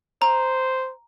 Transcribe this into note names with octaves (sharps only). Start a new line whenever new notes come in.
C5 A#5